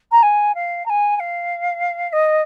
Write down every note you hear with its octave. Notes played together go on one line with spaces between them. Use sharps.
A#5
G#5
F5
A#5
G#5
G#5
F5
F5
D#5